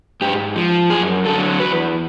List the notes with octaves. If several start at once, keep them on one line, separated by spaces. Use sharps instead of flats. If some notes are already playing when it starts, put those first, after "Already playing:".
G#2 G4
F3
F#2 G#4
D3 F#3 A4
E2 B4